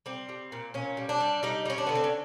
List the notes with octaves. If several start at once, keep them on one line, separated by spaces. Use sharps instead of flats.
G3 C4
G3
A#2
A#2 C#4
G3
D4
G3
G3 D#4
G3 C#4
D4
D3 B3
C4
C#4